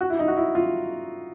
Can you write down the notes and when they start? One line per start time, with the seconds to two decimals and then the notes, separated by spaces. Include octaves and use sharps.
0.01 F#4
0.10 E4
0.19 D#4
0.28 F#4
0.37 E4
0.55 F4